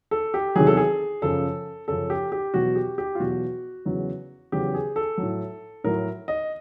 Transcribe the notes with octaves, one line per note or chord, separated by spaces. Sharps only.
A4
G4
E2 C3 D#3 F#3 G#4
A4
G#4
F#2 C#3 F3 A4
F#2 C#3 F3 A4
G4
G4
E2 B2 F#3 F#4
G4
G4
F4
E2 B2 F#3 F#4
E2 C#3 F#3
E2 C#3 F#3 G4
G#4
A4
A2 F#3
A2 F#3 A#4
D#5